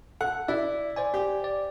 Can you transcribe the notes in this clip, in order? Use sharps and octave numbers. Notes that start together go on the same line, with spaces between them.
A4 F#5
E4 D5 E5
C5 D5 G#5
G4
D5